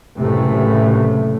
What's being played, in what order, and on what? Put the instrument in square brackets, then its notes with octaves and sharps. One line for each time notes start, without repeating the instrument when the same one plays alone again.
[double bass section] F#1 F#2 A2 C3 E3 A3